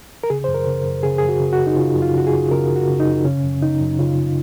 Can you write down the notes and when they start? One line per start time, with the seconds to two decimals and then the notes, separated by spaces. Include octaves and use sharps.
0.24 A#4
0.30 C#3 G#4
0.44 F#2 C5
0.54 A#4
0.67 C#3
0.85 F#2
1.03 C#3 G#4
1.18 F#2 G#4
1.29 F#4
1.40 C#3
1.53 F#4
1.59 F#2
1.67 D#4
1.77 C#3 F4
1.95 F#2
2.02 F4
2.14 C#3 F#4
2.27 G#4
2.33 F#2
2.51 C#3 A#4
2.70 F#2
2.76 F#4
2.88 C#3
3.00 D#4
3.07 F#2
3.25 C#3 C#4
3.43 F#2
3.62 C#3 D#4
3.81 F#2
3.99 C#3 F4